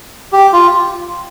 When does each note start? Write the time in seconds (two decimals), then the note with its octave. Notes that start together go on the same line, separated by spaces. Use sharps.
0.32 G4
0.53 F4